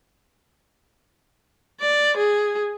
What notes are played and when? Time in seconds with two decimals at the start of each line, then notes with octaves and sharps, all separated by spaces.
1.81 D5
2.17 G#4